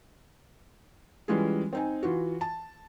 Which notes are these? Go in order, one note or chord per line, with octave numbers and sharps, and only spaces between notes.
E3 G3 G#3 C#4 F4 G#4
C4 D#4 G#5
E3 F4 F#4
A5